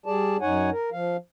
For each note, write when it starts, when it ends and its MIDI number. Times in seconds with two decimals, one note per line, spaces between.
0.06 0.37 55
0.06 0.37 68
0.06 0.37 74
0.06 0.37 81
0.41 0.70 42
0.41 0.70 63
0.41 0.70 73
0.41 0.70 78
0.41 0.70 80
0.71 0.90 70
0.92 1.17 53
0.92 1.17 77